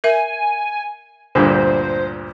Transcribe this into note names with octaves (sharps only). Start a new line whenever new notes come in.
A#4 E5 G#5
D2 G2 A#2 C5